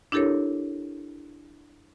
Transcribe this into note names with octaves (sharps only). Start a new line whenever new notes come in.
D4 E4 G4 A4 A#4 C#5